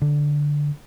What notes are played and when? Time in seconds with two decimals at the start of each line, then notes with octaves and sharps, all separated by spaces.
0.02 D3